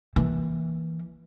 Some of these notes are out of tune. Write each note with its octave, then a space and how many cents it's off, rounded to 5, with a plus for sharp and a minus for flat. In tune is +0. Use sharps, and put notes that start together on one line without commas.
E3 -10 A#3 +0